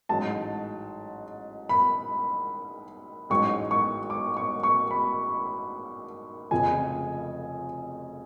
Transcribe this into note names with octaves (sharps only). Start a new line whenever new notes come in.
A1 G#2 F#3 A5
B5
A1 G#2 F#3 C#6
C#6
D6
C#6
C#6
B5
F1 F2 C#3 F3 G#5